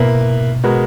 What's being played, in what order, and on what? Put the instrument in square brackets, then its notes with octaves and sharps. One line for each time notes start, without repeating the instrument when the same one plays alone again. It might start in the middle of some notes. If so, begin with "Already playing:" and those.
Already playing: [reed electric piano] B2 [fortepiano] A#3 E4 B4
[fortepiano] G#3 B3 F#4 A#4